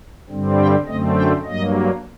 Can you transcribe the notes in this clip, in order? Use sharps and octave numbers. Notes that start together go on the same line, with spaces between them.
G2 D3 G3 C4
G5
F#2 D3 A3 C4 D#5
G5
G2 F#3 A#3 D#5